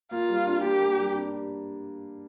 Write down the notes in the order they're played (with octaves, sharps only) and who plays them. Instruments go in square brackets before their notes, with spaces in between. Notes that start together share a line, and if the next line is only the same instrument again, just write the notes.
[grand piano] A#3 [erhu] F4
[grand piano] G3
D4
[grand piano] A#3 [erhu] G4
[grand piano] A#3
G3
D4